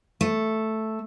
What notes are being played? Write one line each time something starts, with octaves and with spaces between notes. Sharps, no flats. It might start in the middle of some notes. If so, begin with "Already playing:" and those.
A3